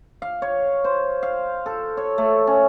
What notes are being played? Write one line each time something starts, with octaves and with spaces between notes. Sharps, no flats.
F5
C#5
C5
F5
A4
C#5
A3
C#4